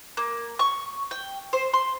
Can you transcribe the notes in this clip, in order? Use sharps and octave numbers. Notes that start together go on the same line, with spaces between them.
A#3
C#6
G5
C5
C6